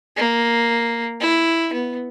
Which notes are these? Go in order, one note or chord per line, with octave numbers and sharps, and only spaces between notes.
A#3
E4
B3